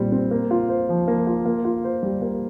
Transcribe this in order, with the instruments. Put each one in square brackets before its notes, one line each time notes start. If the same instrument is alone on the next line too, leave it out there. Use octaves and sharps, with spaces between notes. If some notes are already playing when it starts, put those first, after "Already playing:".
Already playing: [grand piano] A#2 G3 C4
C4
A#3
F4
C5
F3
A#3
F4
A#3
F4
C5
G3
A#3